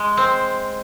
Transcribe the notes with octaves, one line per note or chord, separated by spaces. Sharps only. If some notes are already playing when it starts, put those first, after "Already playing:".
Already playing: G#3
C4